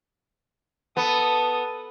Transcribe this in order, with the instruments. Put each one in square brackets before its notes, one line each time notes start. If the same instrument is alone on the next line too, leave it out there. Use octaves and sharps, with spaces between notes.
[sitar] B3 [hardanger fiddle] A4 D#6